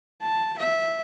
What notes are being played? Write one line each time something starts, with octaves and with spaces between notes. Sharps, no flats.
A5
E5